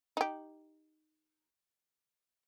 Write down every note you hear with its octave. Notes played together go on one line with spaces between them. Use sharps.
D#4 G4